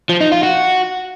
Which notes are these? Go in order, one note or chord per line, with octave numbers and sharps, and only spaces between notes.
F3
D#4
F4
F#4